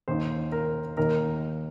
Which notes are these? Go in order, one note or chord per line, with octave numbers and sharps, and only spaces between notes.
D#2 D#3 C5
A#4
D#2 D#3 A#4